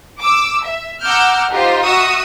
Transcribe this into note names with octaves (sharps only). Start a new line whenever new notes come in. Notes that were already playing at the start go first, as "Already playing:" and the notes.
D6 E6
E5
F#5 A#5 D6 E6 F6 G6
D#4 F4 G4 C5
F#4 E5 C#6 D#6 E6